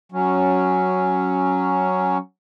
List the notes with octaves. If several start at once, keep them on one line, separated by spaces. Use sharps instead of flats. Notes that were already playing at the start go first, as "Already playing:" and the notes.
F#3 C#4